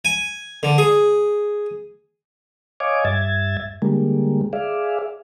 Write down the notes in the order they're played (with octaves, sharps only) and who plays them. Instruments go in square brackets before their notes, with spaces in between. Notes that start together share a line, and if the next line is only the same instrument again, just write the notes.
[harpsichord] G#5
D3
G#4
[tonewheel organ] C#5 D#5 F5 G#5 D6
G2 E5 G#6 A6
D3 G3 G#3 A#3
G#4 D5 E5 F5